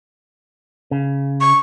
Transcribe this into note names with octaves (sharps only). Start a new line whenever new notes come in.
C#3
C#6